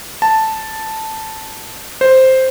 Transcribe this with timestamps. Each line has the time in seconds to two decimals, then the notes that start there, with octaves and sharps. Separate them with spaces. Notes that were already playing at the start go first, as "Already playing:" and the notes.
0.22 A5
2.01 C5